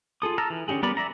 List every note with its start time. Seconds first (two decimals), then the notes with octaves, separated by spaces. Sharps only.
0.22 F4 G#4 A4 D#6
0.38 A5 A#5 E6 F6
0.50 E3
0.68 D3 C#4 E4 G4 G#4
0.83 G3 B3 A#4 B4 D5
0.97 D5 E5 A#5